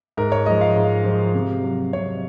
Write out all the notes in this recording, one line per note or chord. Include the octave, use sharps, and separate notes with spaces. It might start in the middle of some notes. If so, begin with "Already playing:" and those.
G#2 A#4
C#5
F3 G#3 D#5
F5
G#2
F3 G#3
C3
F#3
C3 C#5